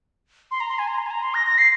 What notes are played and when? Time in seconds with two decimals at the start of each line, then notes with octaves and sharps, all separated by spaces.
0.51 C6
0.60 A#5
0.69 C6
0.79 G#5
0.88 A#5
0.98 C6
1.06 G#5
1.11 A#5
1.23 C6
1.34 A#6
1.47 A#6
1.58 C7